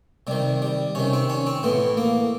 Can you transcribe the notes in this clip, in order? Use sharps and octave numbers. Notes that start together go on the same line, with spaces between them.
C3 D#3 G3
G3
C3 D#3 C#4
C4
C#4
C4
A2 E3 B3
A#3